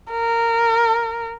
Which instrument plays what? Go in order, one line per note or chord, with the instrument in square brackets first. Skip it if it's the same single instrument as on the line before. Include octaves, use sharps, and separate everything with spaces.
[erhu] A#4